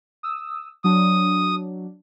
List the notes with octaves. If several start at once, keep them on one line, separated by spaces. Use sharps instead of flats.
D#6 E6
F#3 D4 D#6